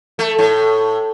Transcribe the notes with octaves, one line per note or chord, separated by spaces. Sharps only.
A3
A2